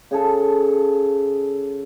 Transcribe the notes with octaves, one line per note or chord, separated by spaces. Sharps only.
C#3 G#4 A4 A5